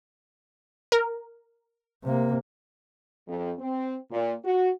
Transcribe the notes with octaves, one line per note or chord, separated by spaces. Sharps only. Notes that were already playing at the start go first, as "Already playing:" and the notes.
A#4
C3 A#3
F2
C4
A#2
F#4